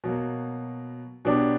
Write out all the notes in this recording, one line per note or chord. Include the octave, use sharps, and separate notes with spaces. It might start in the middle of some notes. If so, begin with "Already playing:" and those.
B2 F#3 A#3
B2 F#3 B3 D4 G4